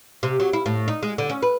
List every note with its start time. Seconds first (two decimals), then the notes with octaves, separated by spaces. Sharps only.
0.23 C3
0.40 F#3
0.53 E4
0.66 A2
0.88 D#4
1.03 G#3
1.18 D3
1.30 C#4
1.43 B4